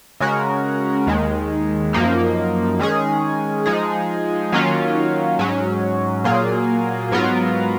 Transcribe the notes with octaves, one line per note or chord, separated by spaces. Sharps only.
C#3 G#3 C#4 F#4 A#4
D#2 D#3 G#3
F#2 F3 A#3 D#4
D#3 G#3 C#4 G#4
F3 G#3 D#4 G#4
D#3 F#3 A#3 C#4 F4
G#2 F#3 C#4
A#2 F#3 A#3 F4 G#4
G#2 F#3 B3 F4 A#4